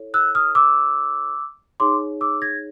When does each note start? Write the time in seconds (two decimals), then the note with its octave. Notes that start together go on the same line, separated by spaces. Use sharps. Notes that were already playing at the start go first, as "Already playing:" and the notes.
Already playing: E4 A4 C#5
0.14 E6 F#6
0.35 D#6 F6
0.55 D6 E6
1.80 D#4 G#4 C#5 C6 D6
2.21 D6 E6
2.42 G#6 A#6